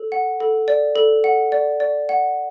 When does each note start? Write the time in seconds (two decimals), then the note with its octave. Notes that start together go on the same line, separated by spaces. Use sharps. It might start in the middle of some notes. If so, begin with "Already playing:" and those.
Already playing: A4
0.12 F#5
0.40 A4
0.68 D5
0.96 A4
1.24 F#5
1.52 D5
1.80 D5
2.09 F#5